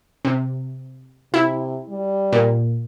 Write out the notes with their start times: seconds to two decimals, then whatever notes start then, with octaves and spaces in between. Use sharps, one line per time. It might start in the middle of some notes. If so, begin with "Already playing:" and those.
0.25 C3
1.34 C3 E4
1.89 G3
2.33 A#2